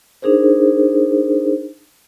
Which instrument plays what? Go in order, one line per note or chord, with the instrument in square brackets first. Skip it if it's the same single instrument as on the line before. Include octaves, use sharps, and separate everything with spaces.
[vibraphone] D4 D#4 G#4 A#4 C5